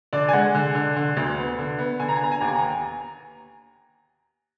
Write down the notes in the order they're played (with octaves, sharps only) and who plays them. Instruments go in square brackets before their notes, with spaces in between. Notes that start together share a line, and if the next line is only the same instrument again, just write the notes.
[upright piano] D3 D5
G#5
G#3 F#5
D3
D3
D3
D2
B3
D3
B3
D3 G#5
A#5
G#5
B3 A#5
G#5
D#2 A#5
G#5
A#5